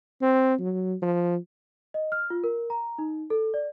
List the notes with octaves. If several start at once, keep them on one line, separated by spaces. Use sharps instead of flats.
C4
F#3
F3
D#5
F6
F4
A#4
A#5
D#4
A4
D5